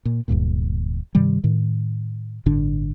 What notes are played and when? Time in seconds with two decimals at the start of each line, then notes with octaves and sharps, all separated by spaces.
0.05 A#2
0.28 D1 D2 G2 A#2
1.15 G2 C3 D#3 G3
1.44 A2 D#3
2.46 G1 A2 D3 D4